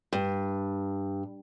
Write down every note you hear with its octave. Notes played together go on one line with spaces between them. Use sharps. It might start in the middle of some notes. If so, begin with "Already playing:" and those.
G2